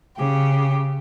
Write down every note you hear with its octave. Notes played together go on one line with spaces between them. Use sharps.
C#3 G4